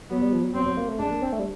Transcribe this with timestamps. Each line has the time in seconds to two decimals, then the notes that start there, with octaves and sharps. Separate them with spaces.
0.10 F#3 B3
0.21 G3
0.33 F3
0.44 F#3
0.54 F#3 C4
0.66 F#3
0.77 A#3
0.88 A3
0.99 G#3 D4
1.11 A#3
1.22 C4
1.33 A3
1.39 G3